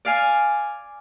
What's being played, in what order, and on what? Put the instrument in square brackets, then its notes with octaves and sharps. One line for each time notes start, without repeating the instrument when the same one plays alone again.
[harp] D5 F5 G#5